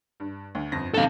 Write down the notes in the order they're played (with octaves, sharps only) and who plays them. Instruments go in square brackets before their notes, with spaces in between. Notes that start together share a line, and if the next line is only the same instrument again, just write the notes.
[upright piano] G2
D2
G1 F2 A#6
[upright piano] D#2 C3 [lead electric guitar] A4 F5